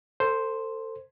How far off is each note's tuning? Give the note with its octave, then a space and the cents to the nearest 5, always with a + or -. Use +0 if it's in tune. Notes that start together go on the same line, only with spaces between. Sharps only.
A4 +30 C5 +0